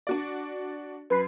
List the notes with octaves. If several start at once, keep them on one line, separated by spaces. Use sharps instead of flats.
D4 F#4 D5
F#2 B4 C7